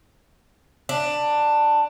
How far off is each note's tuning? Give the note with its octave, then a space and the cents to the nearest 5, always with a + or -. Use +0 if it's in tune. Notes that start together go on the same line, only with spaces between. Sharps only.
D4 +10